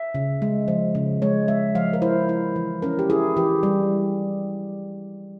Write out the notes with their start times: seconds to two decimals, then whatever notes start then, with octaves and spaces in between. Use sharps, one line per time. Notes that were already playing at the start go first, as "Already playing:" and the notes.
Already playing: E5
0.15 C#3
0.42 G#3
0.68 F3
0.95 C#3
1.22 G#3 C#5
1.48 G#3 E5
1.75 F3 F5
1.93 A#4
2.02 E4 C5
2.29 E4
2.56 E3
2.82 C#4 A#4
2.99 G4
3.10 E4 G#4
3.36 E3 G4
3.63 G3